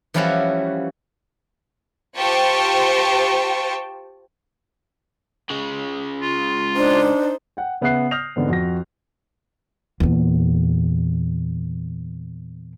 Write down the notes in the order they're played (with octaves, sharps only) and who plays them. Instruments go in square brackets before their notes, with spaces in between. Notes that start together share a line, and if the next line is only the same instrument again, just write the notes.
[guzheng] E3 F3 G3 C#4 E4 F#4
[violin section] F4 G4 C5 G5 A5 C#6
[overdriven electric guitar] C#3 G#3
[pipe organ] F4
[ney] D4 [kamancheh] D#4 C5
[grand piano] F#5 G5
C#3 B3 E5 F#5 F#6 C7
D#6 F6 G6 A#6 F7
G#2 D3 B3 C4
F2 F#4 A#6
[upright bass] E2 A#2